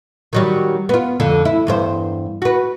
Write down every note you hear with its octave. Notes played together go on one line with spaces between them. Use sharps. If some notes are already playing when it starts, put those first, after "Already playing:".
D#3 F#3 G3
B3 F4
F2 D3 D4
E4
E2 G2 C5
F#4 B4